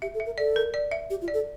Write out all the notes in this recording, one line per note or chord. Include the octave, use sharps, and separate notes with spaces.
G4 E5
A4
E5
A#4
A4 D5
A#4
D5
E5
G4
F4
D5
A4